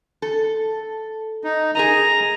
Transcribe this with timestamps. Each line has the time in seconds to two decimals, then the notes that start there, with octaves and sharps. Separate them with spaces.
0.22 A4
1.44 D#4
1.75 G#4 A#4 D#5 A#5